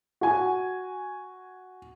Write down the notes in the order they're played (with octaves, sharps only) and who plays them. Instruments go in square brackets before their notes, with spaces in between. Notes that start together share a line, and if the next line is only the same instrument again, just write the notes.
[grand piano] F#4 G#5